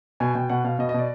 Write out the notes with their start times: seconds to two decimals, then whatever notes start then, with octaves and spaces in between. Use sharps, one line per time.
0.20 B2 G#5
0.35 B2 G5
0.49 B2 F#5
0.64 B2 F5
0.79 B2 D#5
0.89 D#5
0.94 B2 D5